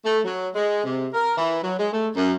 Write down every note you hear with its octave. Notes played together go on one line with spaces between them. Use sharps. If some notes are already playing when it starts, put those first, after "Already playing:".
A3
F#3
G#3
C3
A#4
E3
F#3
G#3
A3
F#2